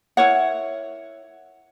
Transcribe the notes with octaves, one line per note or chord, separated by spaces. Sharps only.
E4 A#4 C#5 F#5